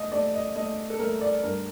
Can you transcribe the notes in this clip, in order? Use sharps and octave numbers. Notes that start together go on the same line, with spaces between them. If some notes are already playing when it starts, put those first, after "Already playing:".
Already playing: A3 D#5
A3 D5
D#5
A3 D#5
A4
A3 A#4
D5
G2 A#4